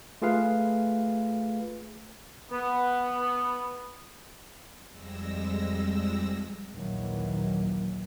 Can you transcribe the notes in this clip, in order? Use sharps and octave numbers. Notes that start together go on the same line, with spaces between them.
A3 F4 G#4 B4 F5
B3
F2 G3 G#3 E6 A#6
A#1 D#2 D#3 E3 F#3